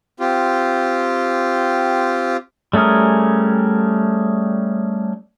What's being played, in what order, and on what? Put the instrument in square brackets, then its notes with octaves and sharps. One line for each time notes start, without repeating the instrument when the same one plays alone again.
[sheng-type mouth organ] C4 F4 G4
[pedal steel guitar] G3 A3 C#4 G#4 A#4